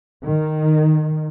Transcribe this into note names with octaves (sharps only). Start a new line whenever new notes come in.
D#3